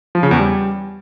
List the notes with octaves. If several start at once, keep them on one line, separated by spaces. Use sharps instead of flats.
F3
C#3
E2
G3